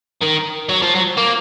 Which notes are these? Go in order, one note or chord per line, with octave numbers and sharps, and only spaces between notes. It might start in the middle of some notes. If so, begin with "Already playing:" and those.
D#3
F#3
F3
F#3
A#3